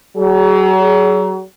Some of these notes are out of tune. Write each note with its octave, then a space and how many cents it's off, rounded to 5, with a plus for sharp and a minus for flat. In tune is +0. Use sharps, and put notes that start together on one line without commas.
F#3 +35 G#4 +10